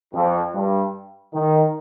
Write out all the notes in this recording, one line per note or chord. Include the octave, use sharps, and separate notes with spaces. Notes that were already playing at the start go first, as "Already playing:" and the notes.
F2
G2
D#3